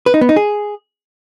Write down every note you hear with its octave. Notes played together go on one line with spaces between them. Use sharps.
B4
D#4
B3
D#4
G#4